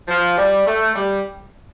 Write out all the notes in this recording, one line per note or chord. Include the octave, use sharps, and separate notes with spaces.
F3
G3
A3
G3